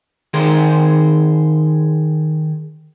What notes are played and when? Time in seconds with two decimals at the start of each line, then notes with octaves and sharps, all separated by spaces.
0.34 D#3 G#4 A#4 C5